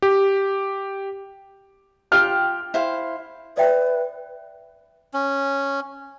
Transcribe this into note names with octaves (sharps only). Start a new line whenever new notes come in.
G4
F4 G4 G5 F6
E4 C5 F5
B4 D5 E5 G5
C#4